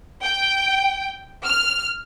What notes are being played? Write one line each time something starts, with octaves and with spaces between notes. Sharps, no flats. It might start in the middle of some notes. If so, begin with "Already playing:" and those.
G5
F6